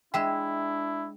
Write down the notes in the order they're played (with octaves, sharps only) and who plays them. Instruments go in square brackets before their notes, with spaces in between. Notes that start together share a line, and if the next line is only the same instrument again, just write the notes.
[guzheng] G#3 E5 [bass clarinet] D4 [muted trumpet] E4 [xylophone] G5